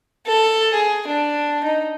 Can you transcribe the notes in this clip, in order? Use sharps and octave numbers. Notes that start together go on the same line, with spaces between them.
A4
G#4
D4
D#4